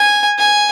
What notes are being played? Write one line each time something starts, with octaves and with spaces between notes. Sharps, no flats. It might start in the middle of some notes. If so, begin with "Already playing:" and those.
Already playing: G#5
G#5